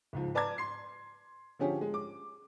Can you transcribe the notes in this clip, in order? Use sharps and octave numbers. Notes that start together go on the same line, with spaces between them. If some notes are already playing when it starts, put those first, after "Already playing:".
C#2 G#2 F3
B4 D5 A5 A#5 D6 G#6
C6 C7
D3 F3 C#4 G4 G#4
G#3
D6